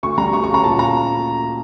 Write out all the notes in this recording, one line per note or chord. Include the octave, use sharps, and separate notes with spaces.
D2 C#6
G3 A#5
D2 C#6
C#6
C#3 A#5
A#2 A5
A#3 A#5